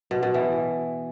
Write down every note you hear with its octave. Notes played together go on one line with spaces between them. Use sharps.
B2
B2
E3